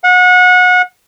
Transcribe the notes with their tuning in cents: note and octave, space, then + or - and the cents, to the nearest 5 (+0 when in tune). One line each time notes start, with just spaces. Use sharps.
F#5 -30